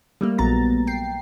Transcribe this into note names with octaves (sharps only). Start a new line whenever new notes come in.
G3 A3 A#3
A#1 F#3 B3 A#5 A6
G5 C7